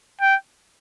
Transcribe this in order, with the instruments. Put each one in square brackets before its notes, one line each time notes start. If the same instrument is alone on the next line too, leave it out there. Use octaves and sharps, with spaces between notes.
[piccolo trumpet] G5